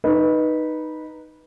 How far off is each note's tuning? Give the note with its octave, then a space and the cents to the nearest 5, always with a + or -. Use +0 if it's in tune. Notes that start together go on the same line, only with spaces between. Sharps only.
D#4 -5 B4 -15